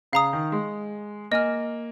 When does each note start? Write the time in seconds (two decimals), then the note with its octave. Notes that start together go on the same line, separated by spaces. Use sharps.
0.13 C#3 F5 A#5 D#6
0.33 D#3
0.52 G#3
1.31 A#3 D#5 G#5 F6